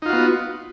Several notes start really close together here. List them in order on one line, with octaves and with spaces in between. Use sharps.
D#4 F4 F#4 B3